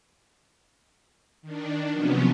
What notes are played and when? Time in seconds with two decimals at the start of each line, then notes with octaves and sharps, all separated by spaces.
1.42 D#3 D4
1.91 C3 F3 F#3 B3 C#4